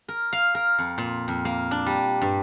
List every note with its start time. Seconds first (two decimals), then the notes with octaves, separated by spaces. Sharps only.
0.08 A#4
0.33 F5
0.55 A#4
0.78 F2
0.98 A#2
1.28 F2
1.45 A#3
1.71 D4
1.86 G3
2.22 G2